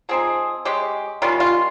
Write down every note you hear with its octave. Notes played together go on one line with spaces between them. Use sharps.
F3 C4 D#4 G#4
C#3 G#3 C#4 G4
D#3 G3 C#4 F4
F4